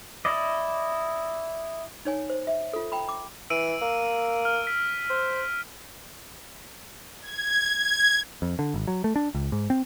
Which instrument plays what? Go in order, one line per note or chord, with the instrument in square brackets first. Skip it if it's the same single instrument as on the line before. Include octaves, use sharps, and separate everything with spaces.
[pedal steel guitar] E4 D5 D#5
[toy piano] D#4 C#5 G#5
C5
E5
F4 A4
G5 A#5 B5
D6
[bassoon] E3 [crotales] E6 D7 D#7
[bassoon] A#3
[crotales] F6
B6
[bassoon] C5
[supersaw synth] G#6
G#6
[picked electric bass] F2
D3
G#1
F#3
A3
D4
C#2
G#2
C4